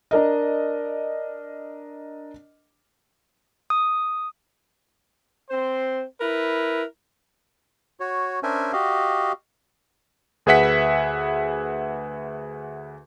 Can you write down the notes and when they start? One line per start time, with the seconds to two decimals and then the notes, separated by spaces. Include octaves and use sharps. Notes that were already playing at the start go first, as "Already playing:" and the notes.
0.11 D4 A#4 D#5
3.70 D#6
5.50 C4 C5
6.21 E4 A#4 B4
8.00 F#4 C#5
8.43 C#4 D4 A#4 C5 E5 G#5
8.73 F#4 G4 D#5 F5
10.46 D2 G#4 B4 E5 F#5 B6